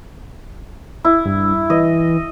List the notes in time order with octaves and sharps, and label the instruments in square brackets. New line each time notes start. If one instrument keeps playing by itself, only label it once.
[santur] E4
[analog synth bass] G2
[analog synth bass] E3 [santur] D#5